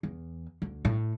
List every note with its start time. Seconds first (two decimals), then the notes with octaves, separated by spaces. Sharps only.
0.03 E2
0.62 D2
0.85 A2